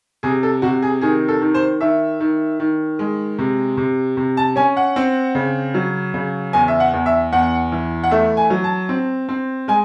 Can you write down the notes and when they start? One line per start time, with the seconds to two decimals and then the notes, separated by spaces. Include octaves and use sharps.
0.23 C3 G#4
0.43 A4
0.62 C3 F#4
0.82 G#4
1.01 D#3 G#4
1.28 A4
1.41 D#3
1.54 C5
1.81 D#3 E5
2.20 D#3
2.60 D#3
2.99 G#3
3.39 C3
3.77 C3
4.17 C3
4.37 A5
4.56 C#4 G#5
4.77 F#5
4.96 C4
5.35 C#3
5.74 F#3
6.14 C#3
6.53 E2 G#5
6.68 E5
6.80 F#5
6.93 E2
7.06 E5
7.32 E2 F#5
7.72 E3
8.03 F#5
8.11 A3 E5
8.37 G#5
8.50 F#3
8.64 A5
8.89 C4
9.29 C4
9.68 G#3 G#5